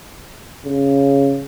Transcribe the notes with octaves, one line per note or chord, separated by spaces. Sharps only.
C#3